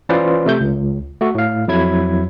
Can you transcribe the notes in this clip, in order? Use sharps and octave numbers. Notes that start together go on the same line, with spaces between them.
E3 C#4 F4 B4 C5 D5
C3 A3 G6
C#2
A3 F#4
A2 F5
F2 F#3 E4 G#6